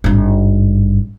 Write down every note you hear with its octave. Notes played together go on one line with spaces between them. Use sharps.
G#1 G2